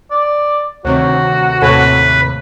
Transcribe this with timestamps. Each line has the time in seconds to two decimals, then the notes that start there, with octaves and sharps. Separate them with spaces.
0.11 D5
0.85 D2 C3 D#3 F#4 C#5
1.62 D#2 A2 C3 A4 B4 C#5 G#5